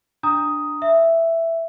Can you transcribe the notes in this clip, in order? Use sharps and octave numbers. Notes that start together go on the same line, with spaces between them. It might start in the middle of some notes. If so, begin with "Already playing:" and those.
D4 A#5 D#6
E5